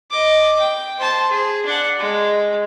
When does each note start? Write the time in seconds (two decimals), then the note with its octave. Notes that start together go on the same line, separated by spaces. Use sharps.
0.11 D#5 D6
0.59 G5
0.99 C5 A5
1.31 G#4
1.66 D4 F#5
1.99 G#3